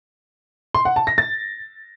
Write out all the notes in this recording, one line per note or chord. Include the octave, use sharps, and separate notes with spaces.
C6
F#5
A5
A#6
A6